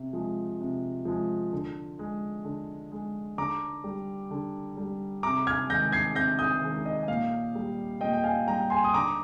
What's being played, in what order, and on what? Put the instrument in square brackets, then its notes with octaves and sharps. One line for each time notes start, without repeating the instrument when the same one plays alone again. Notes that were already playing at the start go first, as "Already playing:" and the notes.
Already playing: [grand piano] C3
F3 G#3
C3
F3 G#3
D3
G#3
D3
G#3
D3 A#5 D6
G3
D3
G3
C3 A#5 D6
F6 G#6
D#3 G#3 G6 A#6
G#6 C7
C3 G6 A#6
D#6 G6
D#3 G#3
D#5
A#2 F5
G3
A#2 D#5 G5
G5
F5 G#5
G3 G5 A#5
G#5 C6
D#6
D3 A#5 D6